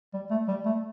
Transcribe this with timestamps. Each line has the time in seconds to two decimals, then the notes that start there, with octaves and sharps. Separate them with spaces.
0.13 G3
0.31 A3
0.48 G3
0.66 A3